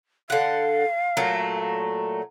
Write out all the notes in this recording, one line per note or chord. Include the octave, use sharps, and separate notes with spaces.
D3 F5 F#5
A#2 F#3 A3